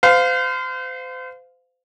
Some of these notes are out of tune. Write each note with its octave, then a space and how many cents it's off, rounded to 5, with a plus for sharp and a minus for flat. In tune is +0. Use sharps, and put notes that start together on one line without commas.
C5 -35 F5 +10